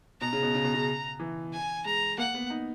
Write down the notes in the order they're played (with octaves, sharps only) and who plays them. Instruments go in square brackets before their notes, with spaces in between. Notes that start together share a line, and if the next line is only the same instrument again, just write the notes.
[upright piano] B2 [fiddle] A#5
[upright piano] C#3
B2
C#3
B2
C#3
E3
[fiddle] G#5
[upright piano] G#3 [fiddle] A#5
[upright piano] A#3 [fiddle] F#5
[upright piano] B3
D#4